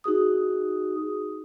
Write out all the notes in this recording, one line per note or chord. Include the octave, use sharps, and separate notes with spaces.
D#4 F#4 G#4 D#6